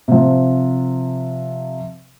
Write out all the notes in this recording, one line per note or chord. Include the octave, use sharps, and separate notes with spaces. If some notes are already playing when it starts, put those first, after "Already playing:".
C3 F3